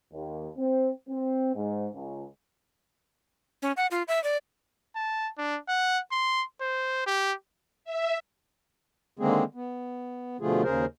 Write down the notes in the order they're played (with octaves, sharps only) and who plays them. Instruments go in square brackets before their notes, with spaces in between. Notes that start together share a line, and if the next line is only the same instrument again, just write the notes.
[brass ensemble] D#2
C4
C4
G#2
C#2
[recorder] C#4
F#5
F4
E5
D5
[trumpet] A5
D4
F#5
C6
C5
G4
[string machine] E5
[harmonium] D3 D#3 G#3 A#3 C4 G#4
B3
B2 D3 F3 A3 F4 G#4
D#2 C#3 G#4 A#4 C5